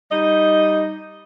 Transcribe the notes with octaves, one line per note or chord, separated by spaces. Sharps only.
G3 D#4 D#5